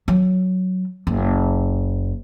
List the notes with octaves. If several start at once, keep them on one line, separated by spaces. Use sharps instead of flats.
F#3
F#1